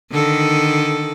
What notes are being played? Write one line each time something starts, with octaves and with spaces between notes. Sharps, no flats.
D3 D#3 A4